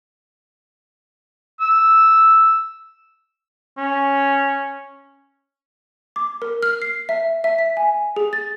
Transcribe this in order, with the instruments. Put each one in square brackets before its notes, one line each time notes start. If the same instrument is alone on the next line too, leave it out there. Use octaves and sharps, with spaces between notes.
[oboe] E6
[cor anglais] C#4
[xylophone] D6
A#4
F6
C7
E5
E5
B6
G#5
G#4
A6